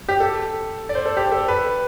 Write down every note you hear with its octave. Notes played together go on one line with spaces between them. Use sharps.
G4
A4
D5
C5
A4
G4
A4
B4